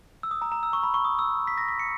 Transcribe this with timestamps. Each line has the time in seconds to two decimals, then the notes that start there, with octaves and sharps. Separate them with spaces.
0.23 E6
0.31 D#6
0.42 A#5
0.52 A#5
0.63 E6
0.73 C#6
0.83 B5
0.94 C#6
1.05 D#6
1.19 E6
1.47 B6
1.58 A#6
1.68 B6
1.79 C#7